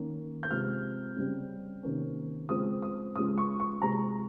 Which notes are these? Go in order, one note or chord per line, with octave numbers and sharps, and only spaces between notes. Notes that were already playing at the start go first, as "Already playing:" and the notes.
Already playing: D#3 A#3 C#4
G6
C3 F3 G#3 C4 F6
C#3 G3 C4
C3 D#3 A#3 C#4
C#3 F3 G#3 C4 D#6
D#6
C#3 F3 G#3 C#4 D#6
C#6
C#6
C3 F3 G#3 C4 A#5